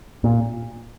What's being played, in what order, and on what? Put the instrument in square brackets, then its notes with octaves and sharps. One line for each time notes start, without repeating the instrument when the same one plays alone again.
[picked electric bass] A#2